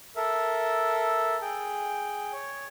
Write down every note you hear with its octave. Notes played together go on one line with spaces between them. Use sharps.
A4 A#4 E5
G#4 G5
C#5